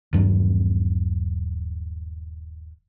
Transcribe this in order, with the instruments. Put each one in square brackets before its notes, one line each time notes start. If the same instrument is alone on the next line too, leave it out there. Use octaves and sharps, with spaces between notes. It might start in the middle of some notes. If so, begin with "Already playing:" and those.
[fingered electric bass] D#1 G2 F#3